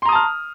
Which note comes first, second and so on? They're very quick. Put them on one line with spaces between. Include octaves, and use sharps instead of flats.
C6 A#5 D#6 A5 F6